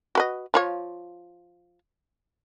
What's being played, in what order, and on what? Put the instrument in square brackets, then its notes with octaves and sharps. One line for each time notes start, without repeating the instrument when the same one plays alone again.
[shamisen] F#4 B4 D#5
F3 F4 C#5